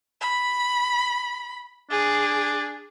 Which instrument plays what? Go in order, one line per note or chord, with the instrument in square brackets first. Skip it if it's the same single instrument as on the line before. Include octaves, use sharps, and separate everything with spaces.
[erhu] B5
[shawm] D4 [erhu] G#4